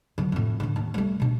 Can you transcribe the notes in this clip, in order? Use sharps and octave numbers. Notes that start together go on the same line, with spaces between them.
D3 F#3
F2 A2
A2 D3
D#2
G3 A3
B2 D4